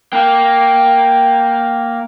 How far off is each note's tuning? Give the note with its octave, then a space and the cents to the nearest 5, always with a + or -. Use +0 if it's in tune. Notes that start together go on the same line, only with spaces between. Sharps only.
A#3 +0 G5 +0